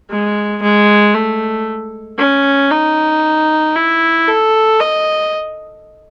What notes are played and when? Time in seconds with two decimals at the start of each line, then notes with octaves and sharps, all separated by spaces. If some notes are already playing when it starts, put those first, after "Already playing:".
0.10 G#3
0.62 G#3
1.14 A3
2.18 C#4
2.71 D#4
3.76 E4
4.27 A4
4.80 D#5